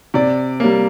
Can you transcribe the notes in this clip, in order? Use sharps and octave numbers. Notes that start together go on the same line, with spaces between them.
C3 D5
G3 A#3